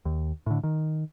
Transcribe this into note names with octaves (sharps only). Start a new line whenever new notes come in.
D#2
A2 D3
D#3